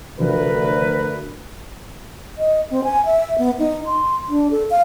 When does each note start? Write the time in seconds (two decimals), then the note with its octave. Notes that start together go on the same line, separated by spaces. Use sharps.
0.20 D2 C3 E3 F3 A#4 B4
2.38 D#5
2.71 C4
2.84 G#5
3.06 E5
3.38 B3
3.59 D#4
3.86 C6
4.29 D4
4.51 A4
4.70 F5